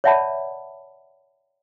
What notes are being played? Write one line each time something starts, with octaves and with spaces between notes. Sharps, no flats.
C#5 D5 E5 F#5 A5 B5